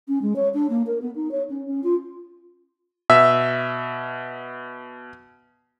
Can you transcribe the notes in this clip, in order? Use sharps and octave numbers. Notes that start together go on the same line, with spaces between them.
C#4
G#3
C#5
D4
A#3
A#4
B3
D#4
C#5
C#4
C#4
F4
B2 E5 E6